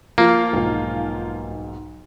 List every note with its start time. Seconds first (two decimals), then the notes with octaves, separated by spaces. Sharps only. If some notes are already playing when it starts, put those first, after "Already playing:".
0.18 F3 A#3 F4
0.53 B1 G#2